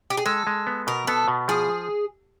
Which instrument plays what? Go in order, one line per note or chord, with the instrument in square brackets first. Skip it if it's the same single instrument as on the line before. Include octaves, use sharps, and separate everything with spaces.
[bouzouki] G4
G#4
[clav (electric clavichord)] G#3 [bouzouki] A4
[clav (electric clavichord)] G#3
B3
[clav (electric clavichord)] B2 [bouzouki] A#4
[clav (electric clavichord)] B3 [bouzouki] A4
[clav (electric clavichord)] B2
[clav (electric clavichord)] F3 [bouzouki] G#4